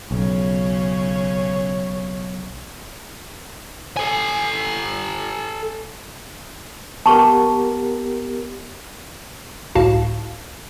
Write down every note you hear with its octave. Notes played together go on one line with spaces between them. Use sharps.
B1 C#3 C#5
A4 G#5
B3 G4 A#4 A5 C#6
G1 C#2 A2 F#4 F5 A5